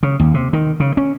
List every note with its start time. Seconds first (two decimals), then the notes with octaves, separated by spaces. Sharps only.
0.03 C#3
0.20 D#2
0.34 C3
0.53 D#3
0.80 C#3
0.97 C#4